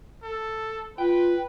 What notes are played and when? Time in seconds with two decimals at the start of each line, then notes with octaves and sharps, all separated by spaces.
0.23 A4
0.98 F4 B4 G5